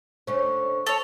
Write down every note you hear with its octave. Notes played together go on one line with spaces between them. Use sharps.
D3 A3 C#4 C5 C#6
A4 C#5